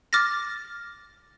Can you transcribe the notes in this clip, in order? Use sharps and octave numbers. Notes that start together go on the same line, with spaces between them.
D6 F6 A6 A#6